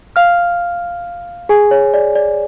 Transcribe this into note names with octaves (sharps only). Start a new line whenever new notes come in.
F5 F6
G#4 G#5
C#5
D5
D5